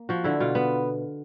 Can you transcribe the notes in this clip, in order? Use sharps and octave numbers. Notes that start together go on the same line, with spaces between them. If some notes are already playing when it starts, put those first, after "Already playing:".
Already playing: A#3
F3 F#4
D3 E4
B2 F4
B3